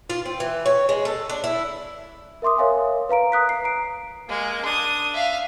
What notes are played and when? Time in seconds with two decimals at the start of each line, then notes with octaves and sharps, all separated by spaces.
0.10 F4
0.25 C4
0.40 E3
0.66 C#5
0.89 G#3
1.05 A4
1.30 D4
1.44 E4
2.42 A#4 E5 C6 D6 D#6
2.58 A#4 C#5 E5 F5 G#5
3.09 B4 F5 A#5 D7
3.32 A#5 D#6 F#6 B6
3.49 C7
3.64 A#5 D7
4.29 G#3 A#3
4.65 D4 D#6
5.14 E5 F5